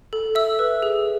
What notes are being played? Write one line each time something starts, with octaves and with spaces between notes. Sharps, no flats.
A4
E5 E6
B4
G#4